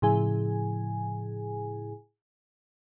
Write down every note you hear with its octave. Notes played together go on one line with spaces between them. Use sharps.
A2 C#3 F3 E4 G#4 G#5